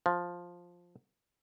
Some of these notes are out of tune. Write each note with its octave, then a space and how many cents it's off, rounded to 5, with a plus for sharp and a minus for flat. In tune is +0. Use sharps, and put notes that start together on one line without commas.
F3 +5